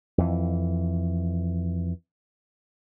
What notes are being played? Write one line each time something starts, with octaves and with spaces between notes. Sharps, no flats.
F2 E3